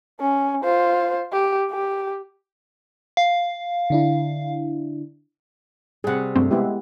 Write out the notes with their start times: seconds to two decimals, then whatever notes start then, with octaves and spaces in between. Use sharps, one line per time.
0.20 C#4
0.64 F4 C5
1.32 G4
1.71 G4
3.17 F5
3.90 D3 D4 E4
6.04 C3 G3 G#4 F#5
6.36 G2 F#3 A3 C4
6.51 G#3 B3 E4 G4